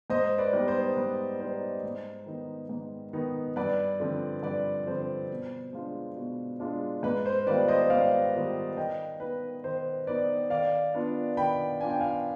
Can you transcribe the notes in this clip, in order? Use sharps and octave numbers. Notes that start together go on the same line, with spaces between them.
G#2 C5 D#5
B4 D5
G3 B3 D#4
C5
G#2 B4
G3 B3 D#4 C5
G#2
D#3 B3 D#4
G#2
D#3 B3 D#4
G2 B4 D5
D3 F3 C4
G2 B4 D5
D3 F3 C4 C5
B2
G#3 D4 F4
B2
G#3 D4 F4
G#2 B4
C5
D#3 G3 B3 F4 B4 D5
C5 D#5
G#2 D5 F5
D#3 G3 B3 F4
D#3 D#5 G5
B3 D#4 B4
D#3 C5
B3 D#4 B4 D5
D#3 D5 F5
B3 D4 F4
D#3 G5 B5
B3 D4 F4 G#5
G5
F5 G#5